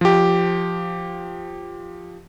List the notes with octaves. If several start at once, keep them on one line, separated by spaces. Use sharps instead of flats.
F3 G4